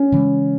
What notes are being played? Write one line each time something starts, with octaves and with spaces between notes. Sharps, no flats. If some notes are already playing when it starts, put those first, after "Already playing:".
Already playing: C#4
C#3 E3 G#3